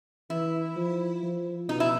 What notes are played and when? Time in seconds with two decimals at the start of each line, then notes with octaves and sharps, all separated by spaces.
0.30 E3 E4
0.76 F3
1.23 F3
1.68 B2 D#4
1.80 E4